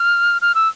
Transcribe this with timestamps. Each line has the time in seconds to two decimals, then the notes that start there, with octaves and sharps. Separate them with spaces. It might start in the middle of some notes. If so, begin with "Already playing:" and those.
Already playing: F6
0.42 F6
0.55 E6